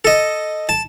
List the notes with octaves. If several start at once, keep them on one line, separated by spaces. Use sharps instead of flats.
A4 D#5
A5